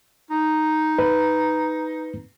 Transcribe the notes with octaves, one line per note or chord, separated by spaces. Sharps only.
D#4
B4